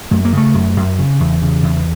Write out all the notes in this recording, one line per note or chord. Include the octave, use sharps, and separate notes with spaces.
F#2 A3
A#3
C#3 A3
F#2
F#2
C#3
E2
C#3
E2